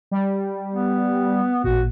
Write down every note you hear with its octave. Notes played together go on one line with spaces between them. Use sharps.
G3
B3
A1 A#2 F#4